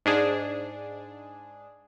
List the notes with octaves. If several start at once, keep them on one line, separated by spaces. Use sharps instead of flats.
G#2 D4 G#4